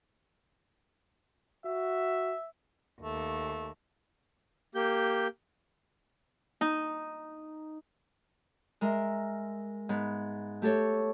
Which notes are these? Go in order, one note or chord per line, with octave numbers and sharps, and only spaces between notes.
F#4 E5
D#2 A3
A#3 G4 G6
D#4
G#3 A#4 E5
G#2 B3
A3 G4 A4 C#5